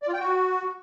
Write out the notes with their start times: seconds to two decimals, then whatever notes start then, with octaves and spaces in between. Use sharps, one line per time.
0.02 D5
0.08 F4
0.14 G5
0.19 F#4